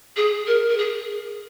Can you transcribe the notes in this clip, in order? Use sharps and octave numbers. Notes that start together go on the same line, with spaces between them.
G#4
A#4
A#4
G#4